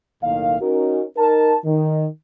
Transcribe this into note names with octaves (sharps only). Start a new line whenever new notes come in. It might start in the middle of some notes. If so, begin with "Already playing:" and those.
B1 A2 D#3 A#3 F5
C#4 D#4 F#4 A#4
D#4 A#4 A5
D#3